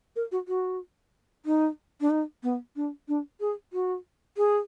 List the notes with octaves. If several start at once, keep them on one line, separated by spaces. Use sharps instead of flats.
A#4
F#4
F#4
D#4
D4
D#4
B3
D4
D4
G#4
F#4
G#4